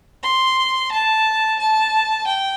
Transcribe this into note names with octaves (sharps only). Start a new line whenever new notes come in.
C6
A5
A5
G5